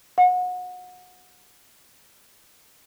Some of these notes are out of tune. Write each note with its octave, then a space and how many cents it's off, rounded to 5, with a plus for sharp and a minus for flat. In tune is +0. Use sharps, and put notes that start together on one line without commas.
F#5 -30